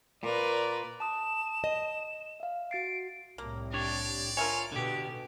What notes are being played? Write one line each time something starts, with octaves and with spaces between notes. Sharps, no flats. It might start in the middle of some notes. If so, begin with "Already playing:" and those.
A#2 A#4 B4 D5
A5 D#6 E7
D#5
E5 F5
F#4 A6 C7 D7
C2 A2 A#3
D4 G4 C#5 D5
F4 A#4 C#5 E5 G#5
B2 D3 G4